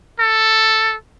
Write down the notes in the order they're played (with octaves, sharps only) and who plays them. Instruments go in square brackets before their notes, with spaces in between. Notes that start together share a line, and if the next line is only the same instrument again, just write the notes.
[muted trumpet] A4